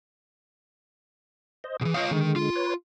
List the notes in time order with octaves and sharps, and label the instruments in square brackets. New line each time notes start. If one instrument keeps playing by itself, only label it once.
[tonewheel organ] C5 D#5
[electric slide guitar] B2 E3 [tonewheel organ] G#4
[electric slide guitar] F4 C#5 F5 [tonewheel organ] D#5
[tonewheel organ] D3 G#3 [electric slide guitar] D#3
[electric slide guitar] F4
[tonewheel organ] B4 C#5